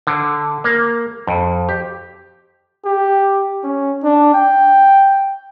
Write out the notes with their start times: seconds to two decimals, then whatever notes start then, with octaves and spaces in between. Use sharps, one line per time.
0.07 D3
0.64 A#3
1.27 F2
1.69 G4
2.85 G4
3.63 C#4
4.04 D4
4.34 G5